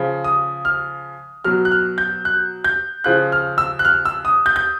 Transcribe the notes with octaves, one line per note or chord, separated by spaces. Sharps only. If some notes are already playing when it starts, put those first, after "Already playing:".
Already playing: C#3 F3
D#6
F6
B2 F#3 F6
F#6
F6
G6
F#6
G6
C#3 F3 F#6
F6
E6
F#6
F6
E6
D#6
G6
G6